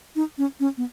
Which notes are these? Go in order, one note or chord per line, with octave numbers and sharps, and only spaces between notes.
D#4
C#4
C#4
B3